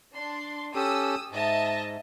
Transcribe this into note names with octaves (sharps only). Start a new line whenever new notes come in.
D4 C6
C#4 G4 A4 D#6 E6
G#2 D#5 E5 A5